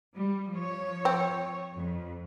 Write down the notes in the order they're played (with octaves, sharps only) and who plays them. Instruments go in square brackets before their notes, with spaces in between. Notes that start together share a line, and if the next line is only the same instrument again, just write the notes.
[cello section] G3
F3 C#5
[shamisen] C4
[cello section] F2